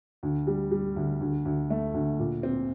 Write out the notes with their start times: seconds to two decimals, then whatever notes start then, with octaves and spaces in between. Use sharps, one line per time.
0.23 D2
0.47 G3
0.71 G3
0.96 D2
1.20 D2
1.45 D2
1.70 A3
1.94 D2
2.19 A#2
2.43 C4